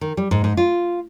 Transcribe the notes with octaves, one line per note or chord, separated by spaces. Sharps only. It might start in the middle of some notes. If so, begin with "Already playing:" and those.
D#3
G3
G#2
G#2
F4